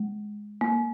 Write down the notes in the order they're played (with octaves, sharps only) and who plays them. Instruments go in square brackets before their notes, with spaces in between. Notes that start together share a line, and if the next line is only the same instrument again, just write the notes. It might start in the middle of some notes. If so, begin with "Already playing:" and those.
Already playing: [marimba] G#3
A#3